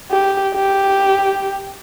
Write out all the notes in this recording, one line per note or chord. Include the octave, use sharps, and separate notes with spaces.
G4
G4